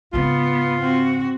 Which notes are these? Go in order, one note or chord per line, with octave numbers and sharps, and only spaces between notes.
G#2 C#3 B3 F4
C4 F#4